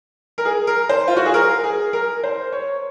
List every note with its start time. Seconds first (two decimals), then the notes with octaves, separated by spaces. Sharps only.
0.38 A#4
0.45 G#4
0.67 A#4
0.89 C5
1.08 F4
1.17 F#4
1.25 G#4
1.34 A#4
1.63 G#4
1.93 A#4
2.23 C5
2.52 C#5